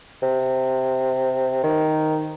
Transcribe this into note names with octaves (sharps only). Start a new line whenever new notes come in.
C3
D#3